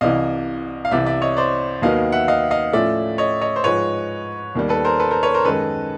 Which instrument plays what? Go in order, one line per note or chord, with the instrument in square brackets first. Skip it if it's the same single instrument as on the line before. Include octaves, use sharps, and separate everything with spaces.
[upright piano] C2 C3 E3 [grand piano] D#5 F5
[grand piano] F5
[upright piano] C2 C3 E3 [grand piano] D5 E5
[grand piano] D5 E5
C#5 D#5
C5 D5
[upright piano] D#2 D#3 F#3 B3 [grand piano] D#5 F5
[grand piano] E5 F#5
D#5 F5
D#5 F5
[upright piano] A2 F3 A3 C#4 F4 [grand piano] D5 E5
[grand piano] C#5 D#5
C#5 D#5
C5
[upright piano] G#2 F3 G#3 [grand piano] B4 C#5
[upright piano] D#2 D#3 G3
[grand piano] A4 B4
A#4 C5
A4 B4
A#4 C5
B4 C#5
A#4 C5
[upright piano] F#2 D#3 G#3 [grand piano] A4 B4